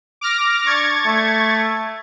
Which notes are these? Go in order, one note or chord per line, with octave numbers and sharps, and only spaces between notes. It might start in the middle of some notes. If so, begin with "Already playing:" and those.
D6 F6 A#6
D4 C#6 G#6 A6
A3